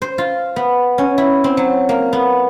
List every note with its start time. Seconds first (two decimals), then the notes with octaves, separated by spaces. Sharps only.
0.02 C5
0.18 F4
0.56 B3
0.98 C#4
1.18 E4
1.44 C4
1.57 F#3
1.89 A#3
2.13 B3